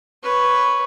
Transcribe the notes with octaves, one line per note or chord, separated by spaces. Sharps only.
B4 C#5